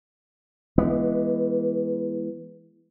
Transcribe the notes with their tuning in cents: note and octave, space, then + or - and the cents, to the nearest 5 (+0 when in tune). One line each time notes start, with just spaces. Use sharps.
E3 +10 G#3 +0 B3 -15